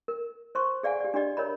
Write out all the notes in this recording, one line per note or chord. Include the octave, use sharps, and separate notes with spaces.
A#4
C5 C6 C#6
G#4 D5 F5 F#5 G#5
G4 D5
D4 F#4 G4 D5 D#5
A#4 C#5 D#5 A#5 B5